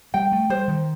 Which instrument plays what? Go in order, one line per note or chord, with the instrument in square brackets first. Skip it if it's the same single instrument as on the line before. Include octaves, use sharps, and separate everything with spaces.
[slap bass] G3 [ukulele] G5
[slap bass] A3
[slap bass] G3 [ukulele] C5
[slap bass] D#3